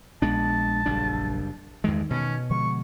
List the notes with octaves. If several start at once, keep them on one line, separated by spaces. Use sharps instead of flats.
A#1 G#3 B3 D4 A5
F#1 G3 D4
E2 G2 D#3 G#3
B2 C#4
D3 F3 G#3 C#6